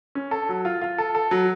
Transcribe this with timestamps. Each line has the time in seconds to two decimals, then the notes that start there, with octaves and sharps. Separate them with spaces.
0.15 C#4
0.31 A4
0.49 F#3
0.65 F4
0.81 F4
0.98 A4
1.15 A4
1.31 F#3